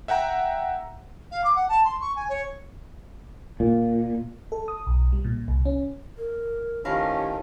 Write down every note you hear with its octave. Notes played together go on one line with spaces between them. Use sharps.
E5 F#5 G5 A#5
F5
D6
F#5
A5
C6
C#6
G#5
C#5
A#2
A4
D#6
B1
G3
A#2
C2
C#4
A#4
A2 D#3 F3 C#4 G4 A#4 B4 F5